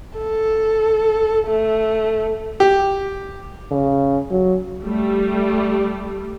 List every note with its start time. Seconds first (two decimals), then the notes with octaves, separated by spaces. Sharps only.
0.18 A4
1.48 A3
2.60 G4
3.71 C#3
4.31 F#3
4.83 G3 A3